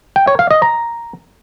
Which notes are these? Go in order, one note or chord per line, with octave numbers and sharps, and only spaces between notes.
G5
C#5
F5
D#5
A#5